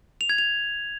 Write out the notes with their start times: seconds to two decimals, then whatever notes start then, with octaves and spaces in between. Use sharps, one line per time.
0.21 F7
0.30 G#6
0.38 F7